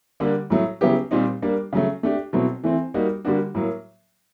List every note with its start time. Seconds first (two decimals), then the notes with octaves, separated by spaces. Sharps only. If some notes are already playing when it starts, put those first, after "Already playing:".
0.20 D3 G3 A#3 D4
0.50 A2 F#3 A3
0.81 C#3 F#3 B3 E4 G4
1.11 A#2 G3 C4 D#4
1.42 G3 A#3 D4
1.73 C#3 F#3 A3
2.03 A3 D4 G4
2.33 B2 F#3 A3 C4 E4
2.64 E3 A3 C4
2.94 G3 A#3 D#4 F#4
3.25 D3 G3 A#3 D4 F#4
3.55 A2 F#3 A#3